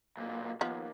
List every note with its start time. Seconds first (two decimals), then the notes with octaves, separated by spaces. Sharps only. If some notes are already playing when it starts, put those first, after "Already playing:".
0.17 B1 A#2
0.61 D#2 F3 B3